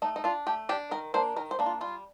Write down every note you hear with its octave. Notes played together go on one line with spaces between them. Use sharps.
A3 D#4
D#4
D4 F4
A3 G4
D4 G4
D#3 A#4
A#3 D4 C5
D#3 A#4
C5
A#3 D4
F4
G3 F4